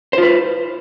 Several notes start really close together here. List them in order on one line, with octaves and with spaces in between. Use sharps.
C5 F4 B4